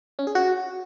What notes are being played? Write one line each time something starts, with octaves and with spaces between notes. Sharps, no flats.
C#4
G#4
F#4